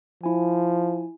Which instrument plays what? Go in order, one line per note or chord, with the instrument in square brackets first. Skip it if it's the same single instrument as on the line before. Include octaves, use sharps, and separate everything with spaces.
[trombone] F3 [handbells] E4 G#5